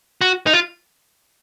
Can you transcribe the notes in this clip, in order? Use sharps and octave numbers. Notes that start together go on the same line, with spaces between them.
F#4
D#4
F4